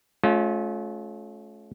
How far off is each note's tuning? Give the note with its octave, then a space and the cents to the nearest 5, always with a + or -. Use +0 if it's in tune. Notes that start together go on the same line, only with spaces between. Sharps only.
A3 -40 C#4 -15 F4 +20